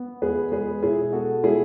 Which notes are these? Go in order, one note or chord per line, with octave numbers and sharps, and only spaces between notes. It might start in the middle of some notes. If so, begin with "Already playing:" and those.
Already playing: B3
E2 G#4 B4
G#3 G#4 B4
B2 E4 G#4
B3 F#4 A4
E4 G#4